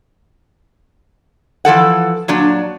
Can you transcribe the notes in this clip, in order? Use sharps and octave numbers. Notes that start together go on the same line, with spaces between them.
E3 F3 A4 F#5
A#2 F#3 D4